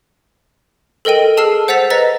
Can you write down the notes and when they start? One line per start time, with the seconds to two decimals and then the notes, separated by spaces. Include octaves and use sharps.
1.05 A4 A#4 D#5 G5 D#7
1.37 G#4 A5 E6 F6 C7 E7
1.68 C5 F#5 E6 A6 B6 F7
1.90 B4 D#5 A#5 A6 B6